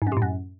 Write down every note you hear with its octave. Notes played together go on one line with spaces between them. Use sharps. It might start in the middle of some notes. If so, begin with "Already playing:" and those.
G#2
F#2
C3
A2
F#2